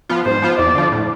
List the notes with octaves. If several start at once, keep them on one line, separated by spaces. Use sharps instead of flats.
F3 B3 F4
G#2 C5
F3 B3 F4
E2 D5
D3 F3
A2